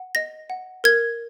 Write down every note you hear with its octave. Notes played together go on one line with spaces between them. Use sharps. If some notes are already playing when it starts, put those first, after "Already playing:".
Already playing: F#5
D#5 A#6
F#5
A#4 G#6